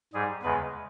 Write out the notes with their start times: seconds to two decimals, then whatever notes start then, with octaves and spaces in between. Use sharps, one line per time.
0.14 G#2 G3 G#4
0.43 E2 C#3 G#3 B4